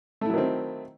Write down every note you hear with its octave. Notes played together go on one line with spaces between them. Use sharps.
D#3 F#3 A3 C4 E4